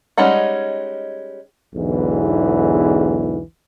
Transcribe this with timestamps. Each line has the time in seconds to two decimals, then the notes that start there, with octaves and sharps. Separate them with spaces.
0.18 G3 G#3 C#4 D#4 F#5
1.75 B1 E2 G#2 D3 E3